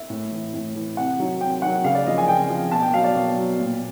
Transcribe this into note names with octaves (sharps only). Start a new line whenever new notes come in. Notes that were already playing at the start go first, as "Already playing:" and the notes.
Already playing: E5
A2
E3
A2
E3
C3 F#5
D#3 F#3
C3 G5
D#3 F#3 F#5
C#3 F5
D5
F3 D#5
G#5
C#3 G5
F3
B2 A5
G5
F#3 F5
D5
B2
F#3
A#2